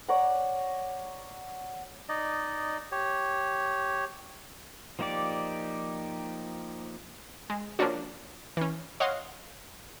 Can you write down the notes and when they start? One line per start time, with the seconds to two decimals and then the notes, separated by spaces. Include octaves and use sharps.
0.09 C#5 D5 F#5 A#5
2.09 D#4 D5 D#5
2.92 G4 C#5
4.99 F3 A#3 D#4 G4 D5
7.50 G#3
7.79 F3 A#3 C#4 D4 F#4
8.57 E3 C#4
9.00 C#5 D#5 F5 F#5 C6